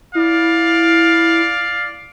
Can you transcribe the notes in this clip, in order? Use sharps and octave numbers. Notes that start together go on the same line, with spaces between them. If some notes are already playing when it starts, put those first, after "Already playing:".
E4 D5 F5